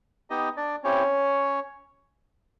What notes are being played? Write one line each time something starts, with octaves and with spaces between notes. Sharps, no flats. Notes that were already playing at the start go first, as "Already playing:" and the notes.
B3 D#4 G4 D#5
D4 D5
C4 C#4 E4 G4 C#5